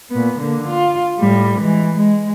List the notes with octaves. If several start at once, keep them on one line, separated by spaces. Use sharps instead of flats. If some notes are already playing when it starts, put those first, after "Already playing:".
A#2 B3
D3 A#3
F4
A2 G3
E3 G#3
G#3